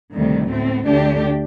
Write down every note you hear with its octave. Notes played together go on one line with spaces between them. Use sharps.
D2 C3 D#3 G3
A2 A3 C4
D2 D3 A3 D4 G4